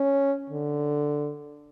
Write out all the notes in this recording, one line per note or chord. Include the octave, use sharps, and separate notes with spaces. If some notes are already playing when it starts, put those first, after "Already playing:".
Already playing: C#4
D3